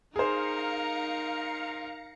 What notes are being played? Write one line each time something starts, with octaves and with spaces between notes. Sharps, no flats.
D#4 G#4 A#4 C5 F5 A#5 C#7